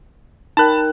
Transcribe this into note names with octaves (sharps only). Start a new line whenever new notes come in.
D#4 A#4 G5 A5 B5 F#6